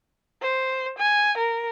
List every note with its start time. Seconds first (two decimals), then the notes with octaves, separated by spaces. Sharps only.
0.41 C5
0.98 G#5
1.38 A#4